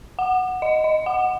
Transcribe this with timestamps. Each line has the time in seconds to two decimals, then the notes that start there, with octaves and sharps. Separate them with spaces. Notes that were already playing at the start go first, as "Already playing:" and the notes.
0.19 F#5
0.62 D#5
0.84 D#5
1.06 F#5